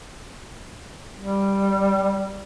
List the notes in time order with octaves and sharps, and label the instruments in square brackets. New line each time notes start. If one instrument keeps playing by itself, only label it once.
[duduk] G3